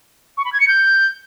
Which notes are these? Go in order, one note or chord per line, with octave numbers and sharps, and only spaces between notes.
C#6
B5
G#6
C#7
G6